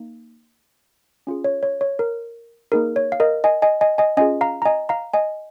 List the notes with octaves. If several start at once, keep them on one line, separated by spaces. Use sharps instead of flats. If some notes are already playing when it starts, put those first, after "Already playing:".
Already playing: A#3 D#4
C#4 F4 G#4
C#5
C#5
C#5
A#4
A#3 D#4 G#4 A#4
C#5
F5
A#4 D#5
D#5 G#5
D#5 G#5
D#5 G#5
D#5 G#5
C#4 F4 G#4 D#5 G#5
F5 A#5
A#5
D#5 G#5
F5 A#5
D#5 G#5